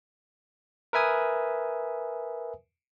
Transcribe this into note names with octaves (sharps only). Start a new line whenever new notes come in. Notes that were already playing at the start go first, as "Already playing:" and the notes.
A#4 B4 E5 G#5 D#6